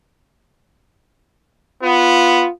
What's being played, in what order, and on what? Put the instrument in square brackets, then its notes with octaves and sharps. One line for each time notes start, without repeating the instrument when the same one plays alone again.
[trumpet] B3 [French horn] F4